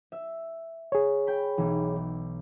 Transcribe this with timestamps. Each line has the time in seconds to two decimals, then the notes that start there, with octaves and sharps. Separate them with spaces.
0.12 E5
0.92 G#4 C#5
1.27 G5 B5
1.58 B1 E3